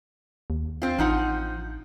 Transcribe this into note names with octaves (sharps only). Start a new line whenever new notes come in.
D#2
C4 F4
A1 F3 D#4 F#5